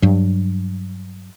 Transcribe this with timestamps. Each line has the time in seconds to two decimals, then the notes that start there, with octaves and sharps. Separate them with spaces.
0.02 G2 F#3